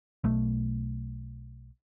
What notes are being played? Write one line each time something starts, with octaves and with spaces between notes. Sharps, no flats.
B1 A3